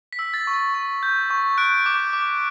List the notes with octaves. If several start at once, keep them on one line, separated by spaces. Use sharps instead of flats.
B6
E6
A6
C#6
A6
C#6
G6
C#6
F#6 D7
D6
D6